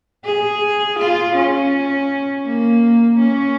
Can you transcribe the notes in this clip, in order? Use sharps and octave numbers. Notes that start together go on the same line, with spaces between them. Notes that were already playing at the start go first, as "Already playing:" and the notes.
G#4
F4
C#4
A#3
C#4